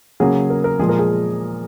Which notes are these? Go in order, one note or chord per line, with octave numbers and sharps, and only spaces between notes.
C#3 F#3 A#3 G#4
A#4
A#4
A#2 F3 G#3 G#4
A#4
G#4